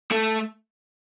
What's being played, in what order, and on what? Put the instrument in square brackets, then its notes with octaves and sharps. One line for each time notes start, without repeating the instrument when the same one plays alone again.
[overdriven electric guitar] A3